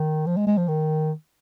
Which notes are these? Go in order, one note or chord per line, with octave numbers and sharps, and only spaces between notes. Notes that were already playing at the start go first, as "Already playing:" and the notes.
Already playing: D#3
F3
G#3
G#3
F3
D#3